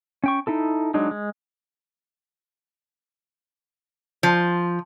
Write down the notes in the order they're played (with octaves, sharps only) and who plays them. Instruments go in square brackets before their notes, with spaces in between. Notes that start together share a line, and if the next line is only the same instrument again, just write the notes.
[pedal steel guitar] C#4 G5 C#6
D#4 E4 A4
F#3 G#3 D4 D#4
G#3
[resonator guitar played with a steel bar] F3